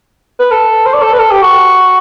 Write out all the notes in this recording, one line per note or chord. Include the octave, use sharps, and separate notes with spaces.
B4
A4
C5
D5
A4
B4
A4
G4
F#4